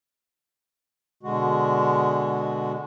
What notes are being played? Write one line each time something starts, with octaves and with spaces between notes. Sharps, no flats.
B2 D3 G#3 F#4